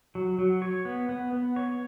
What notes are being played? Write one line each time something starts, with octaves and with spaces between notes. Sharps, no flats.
F#3
F#3
C#5
B3
B3
B3
C#5